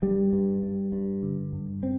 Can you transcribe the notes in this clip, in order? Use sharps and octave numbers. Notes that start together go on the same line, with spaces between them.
G2 G3
G2
G2
G2
D3
G2
C4